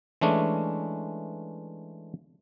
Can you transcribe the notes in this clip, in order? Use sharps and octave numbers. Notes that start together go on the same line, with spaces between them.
E3 G#3 A3 C#4 D4